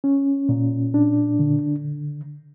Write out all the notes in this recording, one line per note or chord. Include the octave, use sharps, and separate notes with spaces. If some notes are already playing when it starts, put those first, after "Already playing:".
C#4
A#2
D4
D3